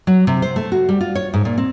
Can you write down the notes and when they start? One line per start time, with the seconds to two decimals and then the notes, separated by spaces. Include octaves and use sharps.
0.07 F#3
0.27 C3
0.42 C5
0.56 A3
0.72 F#4
0.89 G3
1.01 F4
1.15 C#5
1.34 G#2
1.45 A#2
1.58 C4